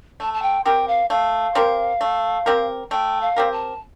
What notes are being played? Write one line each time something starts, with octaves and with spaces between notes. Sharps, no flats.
A3 A5
A5
G5
C4 G4 A#4 G5
F5
A3 F5
C4 G4 A#4
A3
C4 G4 A#4
A3 G5
F5
C4 G4 A#4
A5